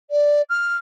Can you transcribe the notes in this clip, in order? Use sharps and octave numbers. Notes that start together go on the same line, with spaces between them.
D5
F6